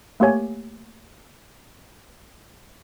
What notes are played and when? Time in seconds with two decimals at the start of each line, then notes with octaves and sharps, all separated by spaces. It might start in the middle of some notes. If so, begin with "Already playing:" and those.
0.20 A3 A#3 G4 C#5 G#5